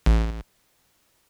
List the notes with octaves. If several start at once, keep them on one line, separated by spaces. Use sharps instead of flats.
A1